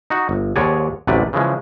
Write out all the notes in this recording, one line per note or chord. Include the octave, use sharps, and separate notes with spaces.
D#4 F#4
G1
D#2 G#2 G#3 C#5 D5 G#5
A1 D2 C3 F#3 B4 D5
C#3 E3 F3 G#3